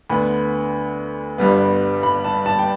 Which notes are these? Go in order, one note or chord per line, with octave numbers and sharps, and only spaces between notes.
D2 D3 B3 B5
G1 G2 G3 B3
B5
A5
A5
G5